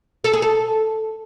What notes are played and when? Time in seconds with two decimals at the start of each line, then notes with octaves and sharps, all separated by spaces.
0.24 A4
0.33 G#4
0.42 A4